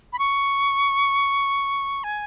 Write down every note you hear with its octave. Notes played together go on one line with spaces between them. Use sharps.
B5
C#6
G#5